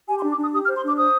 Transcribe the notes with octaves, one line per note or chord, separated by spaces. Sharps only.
G4 G#5
C6
D4
D6
D4 D#6
G4 D#6
F6
C5
C6
D4 D6
C5 D#6